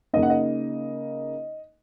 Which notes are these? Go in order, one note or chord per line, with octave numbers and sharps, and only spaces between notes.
C#3 A#3 D#4 D#5
F#5
D#5